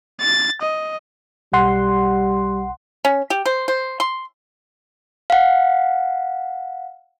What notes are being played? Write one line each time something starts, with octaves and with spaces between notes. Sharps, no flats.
A6
D#5
B1 G3 F#5 C6
C#4
G4
C5
C5
C6
F5 F#5